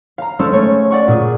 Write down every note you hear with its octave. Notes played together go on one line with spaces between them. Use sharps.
F5 A#5
G#3 C#4 A4 C5
A3 C#5
D5 F#5 C#6
A#2 G#4